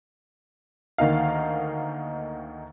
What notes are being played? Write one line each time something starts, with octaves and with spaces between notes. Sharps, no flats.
D2 D#3 A#3 D#4 F5